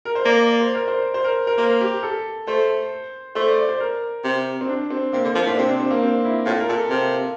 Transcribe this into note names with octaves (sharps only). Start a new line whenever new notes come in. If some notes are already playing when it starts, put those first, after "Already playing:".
A#4
C5
A#3 D5
D5
C5
A#4
C5
C5
A#4
A#4
A#3 C5
G4
A4
A3 C5
A3 C5
D5
D5
C5
A#4
C3
C4
D4
C4
C3 A#3
D3
F3 A#3
A2
D4
C3 C4
D4
C4
A#3
C4
E4
A2 F4
A#4
A#2 A4
C3 A#4